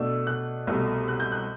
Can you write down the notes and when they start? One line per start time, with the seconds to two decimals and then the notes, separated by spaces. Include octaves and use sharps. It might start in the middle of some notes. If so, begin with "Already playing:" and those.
Already playing: B2 A3 D4 E6
0.27 F#6
0.67 C2 B2 A3
1.08 F#6
1.20 G6
1.32 F#6